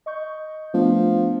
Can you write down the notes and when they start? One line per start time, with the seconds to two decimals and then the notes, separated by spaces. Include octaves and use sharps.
0.06 D#5 C#6 G6
0.74 F3 A3 B3 D4